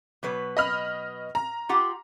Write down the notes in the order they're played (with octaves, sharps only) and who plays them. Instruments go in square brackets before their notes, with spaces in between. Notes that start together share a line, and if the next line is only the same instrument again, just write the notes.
[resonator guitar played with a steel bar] B2 F#3 B4
[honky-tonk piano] D#5 B5 F6
A#5
[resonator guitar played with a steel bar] F4 G4 F#5